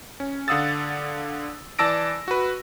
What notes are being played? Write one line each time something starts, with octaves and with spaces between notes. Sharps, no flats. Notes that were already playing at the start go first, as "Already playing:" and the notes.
C#4
D3 F5 F#5 D#6 E6 A6
E3 D5 A5 E6 A#6 D7
F#4 B4